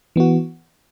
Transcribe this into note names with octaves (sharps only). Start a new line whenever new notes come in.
E3 B3 F#4